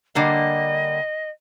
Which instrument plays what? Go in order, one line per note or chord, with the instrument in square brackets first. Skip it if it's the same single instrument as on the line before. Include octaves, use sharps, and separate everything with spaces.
[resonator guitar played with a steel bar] D3 G3 A#3 [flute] D#5